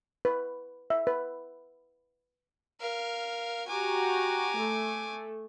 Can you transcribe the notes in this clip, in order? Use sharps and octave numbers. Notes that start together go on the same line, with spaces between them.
B4
E5
B4
A#4 F5
F#4 G4 G#5 A#5 D6
A3 A4